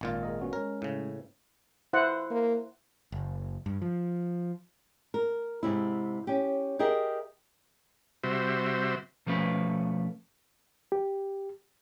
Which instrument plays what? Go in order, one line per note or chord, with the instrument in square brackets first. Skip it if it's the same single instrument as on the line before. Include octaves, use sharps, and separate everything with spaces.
[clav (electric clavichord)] G#1 A#2 F4
[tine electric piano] G#4 A#4 D#5
B3 C#4 F#4
[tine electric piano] G#3 C#4 C#5 [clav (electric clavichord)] A#4
[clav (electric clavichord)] A2 C#3
[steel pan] E4 C5 F#5
[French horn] A#3
[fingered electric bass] F#1
G2
F3
[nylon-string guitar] A#4
G#2 C3 E4
C#4 G4
G4 G#4 A#4 D#5 E5 G5
[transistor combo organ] C3 G3 F#4 C5 E5
[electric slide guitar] B2 F3 A3 C#4 B4
[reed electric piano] G4